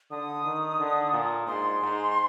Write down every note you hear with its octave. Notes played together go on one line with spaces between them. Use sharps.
D3 D#6
D#3
D3
A#2
G#2 C6
G#2